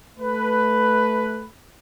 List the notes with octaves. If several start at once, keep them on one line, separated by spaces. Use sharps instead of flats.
A3 B4